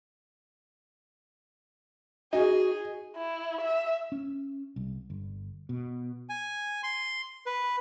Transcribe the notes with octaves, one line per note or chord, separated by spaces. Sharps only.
D#4 F#4 G#4
E4
E5
C#4
C2
G1
B2
G#5
C6
B4